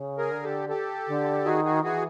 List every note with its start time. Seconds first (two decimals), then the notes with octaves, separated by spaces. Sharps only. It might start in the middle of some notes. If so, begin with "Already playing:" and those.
Already playing: C#3
0.18 G#4 A#4
0.31 D3
0.43 G4 A4
0.69 G4 A4
1.07 D3
1.45 D#3 F#4 G#4
1.65 F#4 G#4
1.83 E3 F#4 G#4